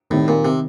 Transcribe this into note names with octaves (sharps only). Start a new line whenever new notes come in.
A2 D#3 G3 C4 D#4
A#2
C3